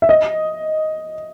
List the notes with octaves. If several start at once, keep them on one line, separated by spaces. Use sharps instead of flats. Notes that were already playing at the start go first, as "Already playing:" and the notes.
E5
D#5